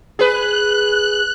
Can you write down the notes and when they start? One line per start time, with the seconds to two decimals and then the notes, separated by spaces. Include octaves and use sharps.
0.19 G#4 B4 F#6